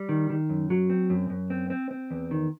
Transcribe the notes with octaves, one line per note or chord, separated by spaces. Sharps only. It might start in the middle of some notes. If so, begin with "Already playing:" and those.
Already playing: G3
D#3
D#3
F#2
F#3
C4
F#2
F#2
C4
C4
C4
E2
D#3